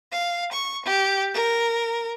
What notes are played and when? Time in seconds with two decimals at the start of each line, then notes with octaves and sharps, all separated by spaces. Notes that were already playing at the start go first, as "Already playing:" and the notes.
0.12 F5
0.51 C#6
0.85 G4
1.34 A#4